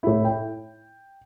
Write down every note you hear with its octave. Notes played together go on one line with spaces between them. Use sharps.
A2 E4
G5